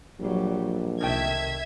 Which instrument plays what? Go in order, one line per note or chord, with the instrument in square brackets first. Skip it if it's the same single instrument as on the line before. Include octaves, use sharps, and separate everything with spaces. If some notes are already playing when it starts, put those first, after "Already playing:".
[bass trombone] A#1 [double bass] F#3 G3
[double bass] C2 [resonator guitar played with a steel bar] D#3 A3 G5 [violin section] E5 G#6